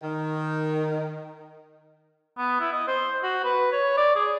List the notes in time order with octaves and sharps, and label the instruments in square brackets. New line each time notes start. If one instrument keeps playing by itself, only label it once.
[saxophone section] D#3
[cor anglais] B3
E4
D#5
C5
F#4
B4
C#5
D5
G#4